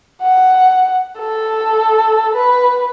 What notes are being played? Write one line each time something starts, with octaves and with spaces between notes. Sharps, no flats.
F#5
A4
B4